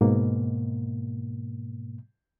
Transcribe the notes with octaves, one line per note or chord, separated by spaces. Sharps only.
G#2 B2 A#3